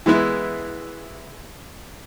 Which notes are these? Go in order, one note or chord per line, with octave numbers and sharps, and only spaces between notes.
E3 G#3 B3 E4